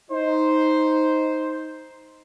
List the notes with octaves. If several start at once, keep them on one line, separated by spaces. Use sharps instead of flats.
D#4 C5